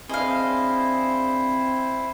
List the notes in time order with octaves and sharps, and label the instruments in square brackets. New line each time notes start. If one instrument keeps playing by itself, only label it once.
[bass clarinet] C4 [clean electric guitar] D4 G#4 [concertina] E4 C5 [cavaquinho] D#5 F5